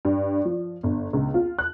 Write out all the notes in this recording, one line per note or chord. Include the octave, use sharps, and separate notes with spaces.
G2
F3
G1
C#2
F4
F#6